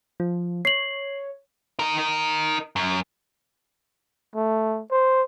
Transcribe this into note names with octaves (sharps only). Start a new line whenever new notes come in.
F3
C#5 C7 F#7
D#4 A#4
F#2
A3
C5